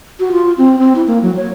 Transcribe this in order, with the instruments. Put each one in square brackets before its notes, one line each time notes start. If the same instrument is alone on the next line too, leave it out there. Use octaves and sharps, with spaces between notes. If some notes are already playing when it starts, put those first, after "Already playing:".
[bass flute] F#4
F4
C4
C4
E4
A#3
F#3
C#5